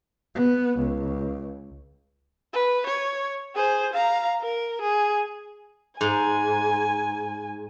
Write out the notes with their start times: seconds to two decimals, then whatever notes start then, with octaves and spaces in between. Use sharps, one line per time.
0.35 B3
0.79 C#2
2.54 B4
2.86 C#5
3.55 G#4 C5
3.93 F5 A#5
4.41 A#4
4.81 G#4
6.01 G#2 G#5